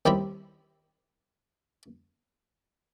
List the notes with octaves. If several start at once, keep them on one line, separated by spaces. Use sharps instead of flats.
D#2 G3 C4 E4 A#5 B5